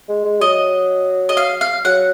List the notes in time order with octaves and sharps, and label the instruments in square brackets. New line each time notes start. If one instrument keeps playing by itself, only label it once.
[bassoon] G#3
G#3
[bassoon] F#3 [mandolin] D#5
[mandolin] D#5
F5
F5
[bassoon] F#3 [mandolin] F#5